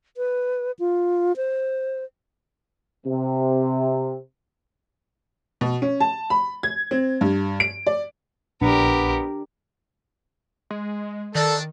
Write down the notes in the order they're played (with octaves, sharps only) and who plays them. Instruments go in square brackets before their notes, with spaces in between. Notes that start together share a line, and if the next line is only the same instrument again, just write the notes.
[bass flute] B4
F4
C5
[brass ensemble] C3
[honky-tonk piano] B2
C#4
A5
B5
G#6
C4
G2
D7
D5
[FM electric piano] A#1 [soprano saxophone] B3 [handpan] D4 [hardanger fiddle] G4 A#4
[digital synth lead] G#3
[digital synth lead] D#3 [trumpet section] D4 [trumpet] A4 [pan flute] D5